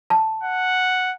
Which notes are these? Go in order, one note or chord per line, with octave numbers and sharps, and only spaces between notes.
A5
F#5